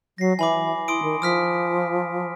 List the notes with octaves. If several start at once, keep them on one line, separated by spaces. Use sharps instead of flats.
F#3 A#6 C7
E3 G#5 B5 D6
E4 C6 D#6 D7
D#3
F3 D#6 F6 B6